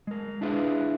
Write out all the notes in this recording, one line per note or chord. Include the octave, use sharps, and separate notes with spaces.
G#3 A#4
D4 E4 F4 G#4 A#4 B4